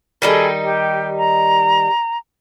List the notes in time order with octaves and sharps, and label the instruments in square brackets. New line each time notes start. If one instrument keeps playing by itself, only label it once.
[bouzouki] D#3 G3 D#4 [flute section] G#4 A4 B5
[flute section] G4
A#5